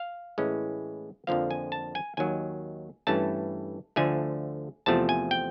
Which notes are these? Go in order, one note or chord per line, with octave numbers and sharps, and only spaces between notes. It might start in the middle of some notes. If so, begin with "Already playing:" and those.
Already playing: F5
A2 E3 G#3 C#4
F2 D3 F3 A#3 F5
G#5
A5
G#5
D#2 D#3 F#3 G#5
G2 E3 A3 C#4 A5
D2 D3 F3 A3 G#5
E2 C3 F3 A3 A5
G#5
G5